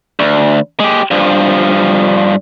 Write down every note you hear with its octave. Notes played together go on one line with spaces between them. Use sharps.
D2
G#3 G4
G2 F3